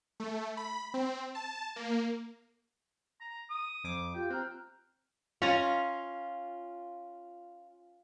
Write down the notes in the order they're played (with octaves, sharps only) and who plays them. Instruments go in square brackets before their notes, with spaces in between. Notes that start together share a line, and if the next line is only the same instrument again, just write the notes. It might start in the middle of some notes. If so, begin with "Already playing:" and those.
[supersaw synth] A3
B5
C4
A5
A#3
[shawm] A#5
D#6
[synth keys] F2 D6
[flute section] F4 G4 [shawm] G5
[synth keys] C4 [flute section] A#5 F6 F#6
[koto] C#4 A#5 [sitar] F4